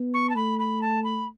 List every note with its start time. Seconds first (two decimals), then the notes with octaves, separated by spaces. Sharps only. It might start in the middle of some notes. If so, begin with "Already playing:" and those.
Already playing: B3
0.13 C#6
0.29 A5
0.35 A3 B5
0.59 B5
0.82 A5
1.04 B5